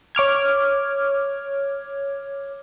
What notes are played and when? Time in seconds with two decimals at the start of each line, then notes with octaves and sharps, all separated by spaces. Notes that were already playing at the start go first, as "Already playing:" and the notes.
0.15 C#5 D6 F6 G#6